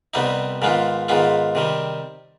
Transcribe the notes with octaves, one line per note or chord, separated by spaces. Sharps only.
C2 C3 G3 B3 D#4
G#2 D#3 G#3 B3 F4
G#2 D#3 G#3 B3 F4
C3 D#3 G3